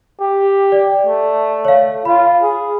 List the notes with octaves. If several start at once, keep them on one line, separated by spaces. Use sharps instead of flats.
G4
D5
A3
C#5 F5
F4 B5
G#4